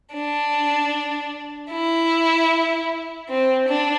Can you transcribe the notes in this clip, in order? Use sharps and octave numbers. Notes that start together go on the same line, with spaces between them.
D4
E4
C4
D4